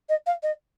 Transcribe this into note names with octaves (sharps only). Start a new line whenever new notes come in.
D#5
F5
D#5